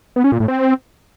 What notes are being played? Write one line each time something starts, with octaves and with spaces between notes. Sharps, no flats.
B3
C#4
A#2
A2
C4